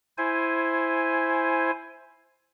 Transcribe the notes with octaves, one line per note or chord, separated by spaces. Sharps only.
E4 C5 G#5